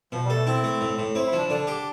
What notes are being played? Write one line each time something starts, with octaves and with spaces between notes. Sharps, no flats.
B2 F3
G3
A4
A3
C4 E4
A3
A2
A2
C4 E4
E4
F3
D4
D3 D4
G4